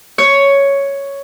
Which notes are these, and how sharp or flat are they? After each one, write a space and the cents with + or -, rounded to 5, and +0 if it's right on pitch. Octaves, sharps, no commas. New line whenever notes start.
C#5 +5